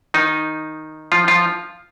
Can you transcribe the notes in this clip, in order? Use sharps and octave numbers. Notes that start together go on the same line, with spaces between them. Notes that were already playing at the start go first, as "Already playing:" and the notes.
D#3 D#4
F3 F4
F3 F4